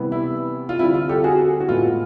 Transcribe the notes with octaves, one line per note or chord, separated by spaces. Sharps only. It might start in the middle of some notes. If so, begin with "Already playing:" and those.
Already playing: C3 E3 G3 B3
E4
F4
D3 G3 C4 E4
F4
G4 A4
F#4 G#4
F#4
A2 E3 G#3 B3 F4